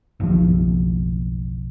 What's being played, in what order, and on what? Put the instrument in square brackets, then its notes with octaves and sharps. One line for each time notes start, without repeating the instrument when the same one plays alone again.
[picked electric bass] F#1 B1 F3